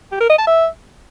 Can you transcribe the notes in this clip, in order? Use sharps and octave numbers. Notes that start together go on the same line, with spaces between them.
G4
A#4
D#5
A5
E5